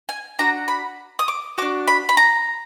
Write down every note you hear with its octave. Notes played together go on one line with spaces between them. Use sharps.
G#5
D4 F#4 A#5
B5
D#6
D6
D4 F#4 D6
B5
B5
A#5